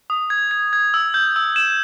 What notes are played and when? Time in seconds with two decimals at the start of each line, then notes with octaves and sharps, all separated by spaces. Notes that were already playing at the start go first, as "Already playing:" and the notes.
0.10 D#6
0.30 G#6
0.51 G#6
0.73 G#6
0.94 E6
1.14 G6
1.36 E6
1.56 E7